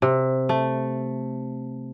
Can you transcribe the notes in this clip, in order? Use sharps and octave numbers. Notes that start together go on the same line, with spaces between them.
C3
A3